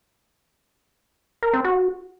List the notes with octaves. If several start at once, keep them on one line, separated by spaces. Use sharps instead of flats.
A#4
C4
F#4